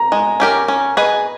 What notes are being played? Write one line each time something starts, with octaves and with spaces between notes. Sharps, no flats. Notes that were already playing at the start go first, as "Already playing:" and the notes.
Already playing: A#5
G#3
C#4 G4 A#4
C#4
G#4 B4 D#5